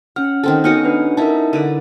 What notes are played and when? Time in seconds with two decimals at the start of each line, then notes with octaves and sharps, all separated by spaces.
0.16 C#4 F#5 F6
0.44 D#3 C4 A4
0.64 B3 C#4 D#4 F#4 F6 C#7
0.85 D4 B4
1.17 D#4 E4 A#4 E5 A5
1.53 D3 B4 D5